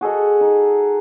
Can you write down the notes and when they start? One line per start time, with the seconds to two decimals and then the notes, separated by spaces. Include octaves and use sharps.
0.01 F#4 G#4 A4 D#5
0.41 D#4